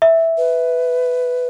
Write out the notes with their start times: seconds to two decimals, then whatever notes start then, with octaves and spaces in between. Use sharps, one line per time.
0.02 E5
0.38 B4